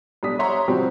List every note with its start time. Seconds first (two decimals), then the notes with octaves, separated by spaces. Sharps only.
0.23 B1 G3 D4 D#6 B6
0.39 C#5 E5 F#5 A#5 C6
0.68 C3 F3 G3 C4 F#4